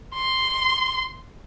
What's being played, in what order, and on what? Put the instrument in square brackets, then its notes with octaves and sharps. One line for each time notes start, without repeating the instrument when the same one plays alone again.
[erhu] C6